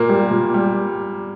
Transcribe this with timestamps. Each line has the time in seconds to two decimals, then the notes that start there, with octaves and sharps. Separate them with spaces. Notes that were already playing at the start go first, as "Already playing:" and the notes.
Already playing: A#2 A#3
0.09 G3
0.31 A#2
0.54 G3